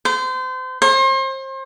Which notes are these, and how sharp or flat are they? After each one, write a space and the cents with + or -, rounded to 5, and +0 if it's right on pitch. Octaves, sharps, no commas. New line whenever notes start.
C5 -30
C5 +35